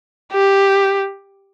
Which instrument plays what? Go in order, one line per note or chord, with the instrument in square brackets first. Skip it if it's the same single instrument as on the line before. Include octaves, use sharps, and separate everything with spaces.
[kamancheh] G4